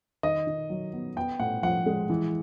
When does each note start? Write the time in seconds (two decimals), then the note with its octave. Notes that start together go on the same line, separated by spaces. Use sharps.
0.23 D#3 D#5
0.47 D#3
0.70 F#3
0.94 B3
1.16 B3 G5
1.39 A2 F#5
1.63 F3 F#5
1.86 G#3
2.10 E3